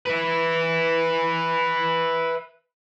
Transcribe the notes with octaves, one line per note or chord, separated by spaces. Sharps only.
B4 E5